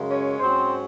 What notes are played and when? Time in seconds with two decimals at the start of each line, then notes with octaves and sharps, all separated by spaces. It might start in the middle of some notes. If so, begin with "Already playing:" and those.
Already playing: F#2 C#3 G#3
0.09 C#4 C#5
0.40 G#2 F#3 C4 C#4 C5